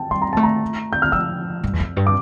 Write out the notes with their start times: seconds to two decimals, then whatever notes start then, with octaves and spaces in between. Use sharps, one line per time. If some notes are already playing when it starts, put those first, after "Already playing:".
Already playing: G5 A5
0.11 G3 C6
0.22 A#5
0.33 A3 A5
0.43 A#5
0.93 G6
1.02 F6
1.12 F3 E6
1.64 G2
1.73 E2
1.80 F2
1.97 G2
2.07 D6